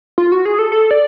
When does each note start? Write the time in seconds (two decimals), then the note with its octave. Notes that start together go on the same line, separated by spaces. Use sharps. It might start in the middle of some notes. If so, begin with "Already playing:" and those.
0.18 F4
0.32 F#4
0.45 G#4
0.59 A4
0.72 A4
0.91 D5